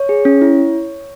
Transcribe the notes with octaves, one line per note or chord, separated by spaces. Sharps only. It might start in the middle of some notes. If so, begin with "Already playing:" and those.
Already playing: C#5
G#4
C#4
E4